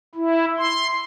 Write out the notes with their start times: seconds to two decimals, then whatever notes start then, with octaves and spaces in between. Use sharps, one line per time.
0.15 E4
0.58 C6